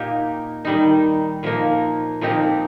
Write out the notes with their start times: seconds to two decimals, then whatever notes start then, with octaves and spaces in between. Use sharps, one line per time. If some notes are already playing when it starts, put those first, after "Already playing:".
Already playing: A#2 A#3 D#4 G4
0.65 D#3 G3 D#4
1.43 A#2 F3 A#3 D#4
2.21 A#2 F3 C4 D#4 G4